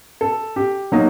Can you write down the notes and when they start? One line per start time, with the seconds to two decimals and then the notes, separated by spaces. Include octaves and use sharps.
0.21 A4
0.56 G4
0.92 F#3 A#3 D#4